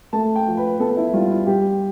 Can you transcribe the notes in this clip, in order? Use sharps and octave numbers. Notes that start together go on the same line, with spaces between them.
A3 A5
G5
F3
B4
B3 A4
E4
G3 F4
E4
G3 G4